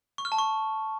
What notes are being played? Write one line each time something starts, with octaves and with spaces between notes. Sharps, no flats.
C#6
F6
A5
C#6